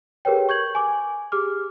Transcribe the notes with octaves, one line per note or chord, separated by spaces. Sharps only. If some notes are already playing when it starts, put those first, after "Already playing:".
G4 G#4 A#4 B4 C#5 G5
C#6 G6 G#6 F#7
G#5 D6
G4 G#4 D6 F6